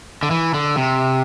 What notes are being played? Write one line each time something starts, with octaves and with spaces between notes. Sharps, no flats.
D3
E3
D3
C3